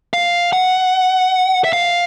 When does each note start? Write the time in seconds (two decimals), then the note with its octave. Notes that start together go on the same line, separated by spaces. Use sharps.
0.13 F5
0.53 F#5
1.64 E5
1.73 F5